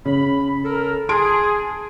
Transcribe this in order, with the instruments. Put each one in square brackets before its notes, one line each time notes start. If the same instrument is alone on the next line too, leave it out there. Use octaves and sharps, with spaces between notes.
[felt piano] C#3 [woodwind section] B5
[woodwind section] A4 A#4
[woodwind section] G#4 [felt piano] A5 C6 D7